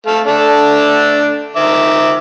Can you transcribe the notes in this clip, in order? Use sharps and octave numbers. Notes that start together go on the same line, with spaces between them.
A3 F5
A3 D4 A4
D#3 E5 D6